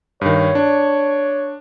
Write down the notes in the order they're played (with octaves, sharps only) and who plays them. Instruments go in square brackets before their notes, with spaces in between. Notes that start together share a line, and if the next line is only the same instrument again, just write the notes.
[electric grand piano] G2 D#3 [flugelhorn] C#5
[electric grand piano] D4